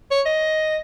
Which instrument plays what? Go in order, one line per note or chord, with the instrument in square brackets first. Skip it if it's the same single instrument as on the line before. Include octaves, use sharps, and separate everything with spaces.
[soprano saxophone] C#5
D#5